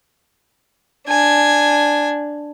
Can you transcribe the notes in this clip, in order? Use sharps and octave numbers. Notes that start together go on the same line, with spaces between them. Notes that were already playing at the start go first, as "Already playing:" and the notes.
D4 G#5